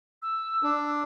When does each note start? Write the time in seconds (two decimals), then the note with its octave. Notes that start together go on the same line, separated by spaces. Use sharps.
0.22 E6
0.63 D4